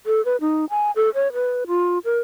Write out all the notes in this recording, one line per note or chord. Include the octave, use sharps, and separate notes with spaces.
A4
B4
D#4
G#5
A4
C#5
B4
F4
A#4